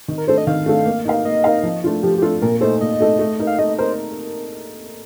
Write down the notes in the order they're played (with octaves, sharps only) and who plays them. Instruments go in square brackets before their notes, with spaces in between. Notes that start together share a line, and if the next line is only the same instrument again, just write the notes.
[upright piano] D#3
[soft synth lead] A#4
[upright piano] A3 D4 A4 [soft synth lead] C5
[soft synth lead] D#5
[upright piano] D#3 [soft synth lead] F5
[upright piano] A3 D4 A4
A#3
D#4 A#4 F5
[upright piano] A#3 [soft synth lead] D#5
[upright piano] D#4 A#4 F5
F3
A3 D4 F4
[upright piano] F3 [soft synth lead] G4
[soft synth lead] G4
[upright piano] A3 D4 F4 [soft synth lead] A4
[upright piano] A#2 [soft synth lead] A#4
[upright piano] A3 D#4 A4 [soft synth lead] C5
[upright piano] A#2 [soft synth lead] D#5
[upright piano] A3 D#4 A4
A3
D#4 A#4
[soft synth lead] F5
[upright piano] A3 [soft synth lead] D#5
[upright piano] D#4 A#4 [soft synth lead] C5